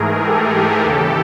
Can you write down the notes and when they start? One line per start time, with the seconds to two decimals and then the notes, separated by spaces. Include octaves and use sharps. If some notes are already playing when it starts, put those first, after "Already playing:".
Already playing: G#2 E3 A3 G#4 A#4
0.23 G4 A4
0.53 G4 A4
0.83 D#2 C#3 E3 G4 A4